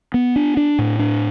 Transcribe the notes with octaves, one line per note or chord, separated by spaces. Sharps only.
B3
D4
D4
A2
D4